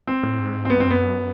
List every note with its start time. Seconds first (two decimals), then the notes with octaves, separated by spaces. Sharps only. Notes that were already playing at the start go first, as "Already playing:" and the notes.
0.07 C4
0.23 A2
0.39 G#2
0.65 C4
0.70 G2 B3
0.80 C4
0.86 F#2 B3